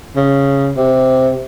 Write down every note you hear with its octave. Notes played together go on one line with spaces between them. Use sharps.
C#3
C3